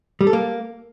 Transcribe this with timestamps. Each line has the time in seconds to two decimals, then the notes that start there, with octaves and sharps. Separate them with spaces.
0.21 G3
0.27 A4
0.33 A#3